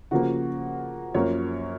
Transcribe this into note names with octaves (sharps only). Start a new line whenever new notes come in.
C#3 F3 A#3 F#4
F#2 F3 A#3 C#5